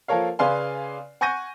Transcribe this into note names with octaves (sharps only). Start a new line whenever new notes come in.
F3 A#3 A4 A#4 C#5 F5
C#3 B4 D5 F5 G#5 C6
F#5 G#5 C#6 G6 A#6 D#7